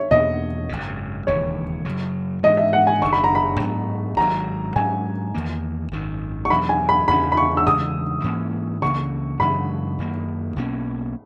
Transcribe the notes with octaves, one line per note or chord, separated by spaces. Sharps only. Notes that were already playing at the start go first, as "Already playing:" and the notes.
Already playing: C#5 E5
E2 B2 A#3 D#5
G#1 F#2 C#3
E1 D#2 C#3 E3 C#5
F#2 C#3 F#3
G#2 E3 G#3 D#5
E5
F#5
G#5
F#1 F#2 D#3 C#6
B5
A#5
B5
G#2 F#3 B3
G#1 G#2 D#3 F#3 A#5
G#2 F#3 C#4 G#5
E2 D#3 A#3
G#1 F#2 D#3
C#6
E2 B2 F#3 B5
G#5
B5
E2 C#3 F#3 C#4 B5
B5
C#6
E6
E2 C#3 E3 G#3 D#6
G#2 E3 A#3 C#4
C#2 C#3 E3 A#3 C#6
F#2 C#3 E3 G#3 B5
F#2 D#3 A#3
B1 B2 A#3 C#4